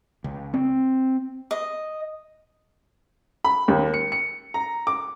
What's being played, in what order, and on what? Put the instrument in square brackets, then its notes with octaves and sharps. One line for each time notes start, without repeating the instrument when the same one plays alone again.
[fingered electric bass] C#2
C4
[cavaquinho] D#5
[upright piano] B5
D#2
C#7
C#7
A#5
D6